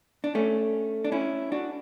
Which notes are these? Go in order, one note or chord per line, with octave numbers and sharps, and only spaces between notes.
D4
A3 C#4
D4
C#4 E4
D4 F#4